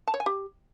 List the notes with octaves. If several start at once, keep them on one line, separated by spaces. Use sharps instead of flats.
A5
C#5
G#5
G4